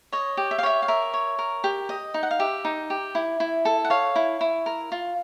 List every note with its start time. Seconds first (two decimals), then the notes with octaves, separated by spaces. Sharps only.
0.12 C#5 D#5
0.37 G4
0.51 E5
0.59 F5
0.63 C#5 E5
0.82 F5
0.88 A#4 E5
1.14 C#5
1.39 A#4
1.64 G4
1.89 D#5
2.14 D#4
2.23 F#5
2.31 F5
2.40 G4 E5
2.65 D#4
2.90 G4
3.15 E4
3.40 E4
3.65 A4
3.85 F#5
3.90 C#5 F5
4.16 E4
4.41 E4
4.66 A#4
4.92 F4